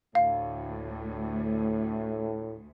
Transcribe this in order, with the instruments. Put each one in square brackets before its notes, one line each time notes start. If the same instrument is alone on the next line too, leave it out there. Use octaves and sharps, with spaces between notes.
[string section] D2 [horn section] A2 [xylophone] F5